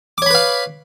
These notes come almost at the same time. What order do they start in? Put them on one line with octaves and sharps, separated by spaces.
D6 C#5 B5 B4 F5